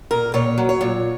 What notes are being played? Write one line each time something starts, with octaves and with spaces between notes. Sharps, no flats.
A#2 A#4
A#2 C#5
F#3
C#5
A#2